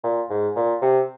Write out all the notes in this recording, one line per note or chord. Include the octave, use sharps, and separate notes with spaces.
A#2
G#2
A#2
C3